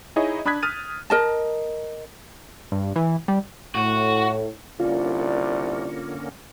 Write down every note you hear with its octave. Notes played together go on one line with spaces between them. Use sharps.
D#4 E4 G#4 C#5 D#5
D4 B5 D#6 F#6 G#6 B6
D#6 F6 A6 D#7
A#4 D#5 A5
G2
E3
G3
A2 F#4
C2 D3 A#3 C#4 F4 D5